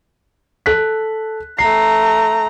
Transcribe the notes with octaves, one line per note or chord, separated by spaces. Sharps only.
A4 F#6 B6
A3 A#5 C7